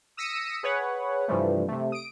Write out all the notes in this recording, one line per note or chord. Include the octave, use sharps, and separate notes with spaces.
D#6 E6 A#6 B6 C#7 D#7
G#4 B4 C#5 F#5
G2 C3 E3 F3 G3 A3
C3 A3
D#6 D7